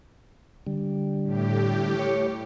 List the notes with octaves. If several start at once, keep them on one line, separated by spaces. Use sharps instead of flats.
D3 G3
A2 G4
C#5